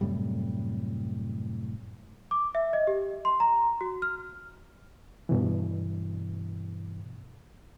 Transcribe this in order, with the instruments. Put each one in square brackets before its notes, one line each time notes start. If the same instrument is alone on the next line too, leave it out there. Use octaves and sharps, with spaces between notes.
[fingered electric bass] F#2 A2 C3 G3
[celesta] D6
E5
D#5
G4
C6
A#5
F#4
F6
[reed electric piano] G2 B2 E3